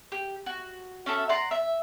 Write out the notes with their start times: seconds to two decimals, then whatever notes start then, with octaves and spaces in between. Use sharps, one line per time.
0.12 G4
0.46 F#4
1.06 C#4 F#4 A4 E5
1.29 D5 F#5 A#5 C6
1.51 E5